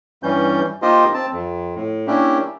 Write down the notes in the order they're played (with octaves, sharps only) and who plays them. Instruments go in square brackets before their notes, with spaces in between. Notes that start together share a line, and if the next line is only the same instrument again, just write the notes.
[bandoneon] G2 E3 G3 C#4 G6
A#3 D#4 F4 G4 C5 D#5
C4 A5
F2
A2
A#3 C#4 D4 E4 G4